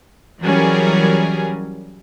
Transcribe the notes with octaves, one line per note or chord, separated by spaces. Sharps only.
E3 F#3 G3 C#4 G#4 A#4